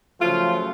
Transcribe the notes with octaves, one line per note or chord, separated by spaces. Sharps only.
C#3 F3 F#3 A3 F4